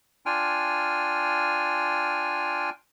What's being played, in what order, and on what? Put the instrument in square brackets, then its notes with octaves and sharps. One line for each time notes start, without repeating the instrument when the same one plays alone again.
[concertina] D4 F4 G5 G#5 F6